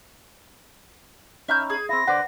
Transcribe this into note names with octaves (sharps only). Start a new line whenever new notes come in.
C#4 D#4 E4 E5 F6 G6
G#4 G#6
C4 E4 A#6
D3 B4 C5 D5 F#5